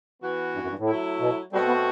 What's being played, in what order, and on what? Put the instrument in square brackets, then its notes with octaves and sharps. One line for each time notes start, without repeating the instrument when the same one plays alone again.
[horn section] E3 B3 F#4
[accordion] G2
F#2
G2
A2
[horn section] F#3 A3 E4
[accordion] B2
[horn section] B2 A3 C4 F#4 [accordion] G3
[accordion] B3